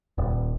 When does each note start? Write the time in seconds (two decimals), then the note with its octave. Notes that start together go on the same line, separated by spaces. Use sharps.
0.18 D#1